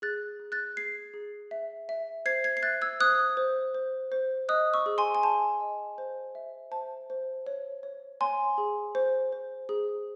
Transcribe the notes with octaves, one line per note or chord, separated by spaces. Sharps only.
G#4 F#6 A6
G#4
F#6 A6
G#4 G#6 C7
G#4
E5
E5
C5 G#6 C7
G#6 C7
C7
E5 F#6 A6
E6 G#6
C5 D#6 F#6
C5
C5
C5
D#5 D#6 F#6
C#6 E6
G#4
G#5 C6
G#5
G#4 A5
D#5
C5
E5
C5 A5
C5
C#5
C#5
C#5 G#5 C6
G#4
C5
C5
G#4